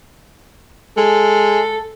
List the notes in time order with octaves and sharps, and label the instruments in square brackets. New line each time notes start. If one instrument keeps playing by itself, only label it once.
[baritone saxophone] G#3 [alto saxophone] A4